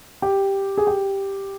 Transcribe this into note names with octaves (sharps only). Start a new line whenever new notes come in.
G4
G#4
G4